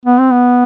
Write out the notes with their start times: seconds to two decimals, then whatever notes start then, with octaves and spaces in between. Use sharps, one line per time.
0.06 B3
0.19 C4
0.32 B3